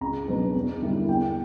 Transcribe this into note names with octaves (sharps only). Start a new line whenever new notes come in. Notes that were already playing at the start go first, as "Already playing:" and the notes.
C#2 A#5
B2 F#3 B3 D4
E2
D3 G3 A#3 E4
E2 G5